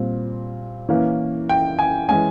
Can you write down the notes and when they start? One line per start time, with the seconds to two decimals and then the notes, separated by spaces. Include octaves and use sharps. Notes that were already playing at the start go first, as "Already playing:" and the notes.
Already playing: A#2 G3 C4
0.89 E3 A#3 C#4
1.49 G5
1.79 G#5
2.09 E3 G#3 C#4 G#5